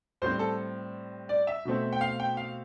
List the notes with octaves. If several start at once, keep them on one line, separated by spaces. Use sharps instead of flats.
A2 G3 C4 C5
A4
D5
E5
B2 A3 C4
G5
F5
G5
F5